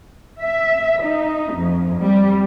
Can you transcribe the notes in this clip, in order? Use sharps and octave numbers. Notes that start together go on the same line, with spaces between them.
E5
D#4
F2
G3